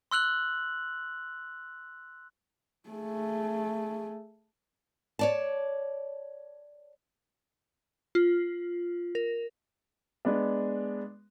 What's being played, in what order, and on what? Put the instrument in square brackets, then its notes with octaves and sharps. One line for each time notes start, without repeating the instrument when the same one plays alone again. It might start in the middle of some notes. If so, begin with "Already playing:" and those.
[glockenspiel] C6 E6 F#6 F#7
[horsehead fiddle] A3 G#4
[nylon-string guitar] C#5 D5 A5
[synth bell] F4
A#4
[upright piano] G#3 B3 D4